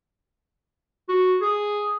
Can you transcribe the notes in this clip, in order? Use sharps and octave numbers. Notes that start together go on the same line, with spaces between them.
F#4
G#4